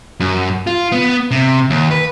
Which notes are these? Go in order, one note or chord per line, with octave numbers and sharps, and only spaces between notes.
F#2
F4
B3
C3
D#2
B4